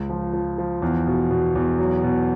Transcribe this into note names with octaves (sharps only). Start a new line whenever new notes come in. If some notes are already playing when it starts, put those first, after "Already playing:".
Already playing: C#2
F3
F3
F3
E2
B2
B2
E2
F#3
B2